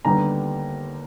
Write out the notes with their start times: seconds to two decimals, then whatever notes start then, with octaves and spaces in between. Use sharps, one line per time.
0.05 D#2 D3 G3 B3 A#5